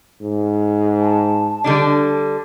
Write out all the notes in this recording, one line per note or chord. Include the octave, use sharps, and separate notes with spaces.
G#2
A5
D3 G3 D4